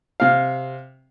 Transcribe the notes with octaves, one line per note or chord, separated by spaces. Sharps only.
C3 F5